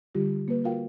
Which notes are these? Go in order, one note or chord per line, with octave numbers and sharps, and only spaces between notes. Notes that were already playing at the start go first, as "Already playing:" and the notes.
D3 G3 F4 G4
A#3 B4
F4 F#4 A#4 F5 G5